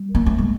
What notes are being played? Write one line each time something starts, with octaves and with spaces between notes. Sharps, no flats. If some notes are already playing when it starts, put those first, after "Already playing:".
Already playing: G3
A#3
A3
G#3